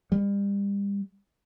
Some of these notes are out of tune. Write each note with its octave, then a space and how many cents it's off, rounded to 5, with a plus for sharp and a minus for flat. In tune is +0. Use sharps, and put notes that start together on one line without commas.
G3 +35